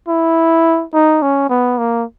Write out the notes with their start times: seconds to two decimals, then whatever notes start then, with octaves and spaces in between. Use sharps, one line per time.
0.08 E4
0.94 D#4
1.22 C#4
1.50 B3
1.78 A#3